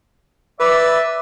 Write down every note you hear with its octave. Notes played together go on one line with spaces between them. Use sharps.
B4 D5 E5